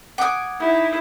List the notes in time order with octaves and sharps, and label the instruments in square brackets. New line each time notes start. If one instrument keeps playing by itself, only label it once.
[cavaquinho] F#5 D#6 [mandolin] G#5 D6
[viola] D#4 E4